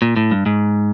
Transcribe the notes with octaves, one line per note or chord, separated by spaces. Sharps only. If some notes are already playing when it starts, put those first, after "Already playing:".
A#2
A2
G2
G#2